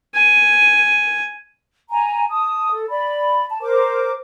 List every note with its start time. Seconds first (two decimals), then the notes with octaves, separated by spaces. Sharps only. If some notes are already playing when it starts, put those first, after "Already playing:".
0.15 G#5
1.89 G#5 A#5
2.29 A5 D#6
2.72 A4
2.90 D5 B5
3.50 A5
3.62 A#4 C5 D6